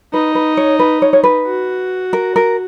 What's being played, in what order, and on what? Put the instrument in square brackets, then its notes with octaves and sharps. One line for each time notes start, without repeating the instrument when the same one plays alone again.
[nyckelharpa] D#4 [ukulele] B4
[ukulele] B4
C#5
B4
C#5
C#5
B4
[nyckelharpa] F#4
[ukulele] A#4
A#4